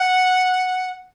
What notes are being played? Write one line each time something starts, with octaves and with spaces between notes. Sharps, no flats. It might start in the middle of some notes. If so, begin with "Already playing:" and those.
Already playing: F#5